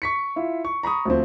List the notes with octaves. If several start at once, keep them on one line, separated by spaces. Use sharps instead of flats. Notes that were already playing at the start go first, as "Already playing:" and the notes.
C#6 B6 C#7
E4 F4
C#6
A#5 B5 C#6 D#6
D2 F3 C4